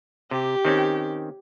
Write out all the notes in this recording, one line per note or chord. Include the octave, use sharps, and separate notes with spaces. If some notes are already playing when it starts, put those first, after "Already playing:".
C3 G4
D#3 C4 C#4